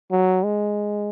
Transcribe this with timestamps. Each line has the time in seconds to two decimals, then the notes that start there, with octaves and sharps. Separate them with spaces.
0.11 F#3
0.44 G#3